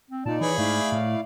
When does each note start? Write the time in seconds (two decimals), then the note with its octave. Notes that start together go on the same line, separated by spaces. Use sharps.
0.10 C4
0.26 A#2 D#4 D5 A5
0.41 E3 G#4 C#5 B5
0.58 G#2 A3 E4 D5 F5
0.92 A2